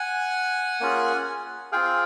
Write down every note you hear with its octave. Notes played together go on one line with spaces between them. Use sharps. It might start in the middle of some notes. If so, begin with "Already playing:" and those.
Already playing: F#5 G#5
A#3 C#4 F4 G#4
C4 F4 G#4 F5 G5